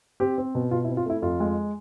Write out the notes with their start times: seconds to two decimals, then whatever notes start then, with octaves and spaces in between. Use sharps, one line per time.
0.20 C4 G4
0.38 C4
0.55 B2
0.71 B2 F4
0.84 E4
0.89 C4
0.97 F4
1.06 A3 E4
1.22 F2 F4
1.40 G#3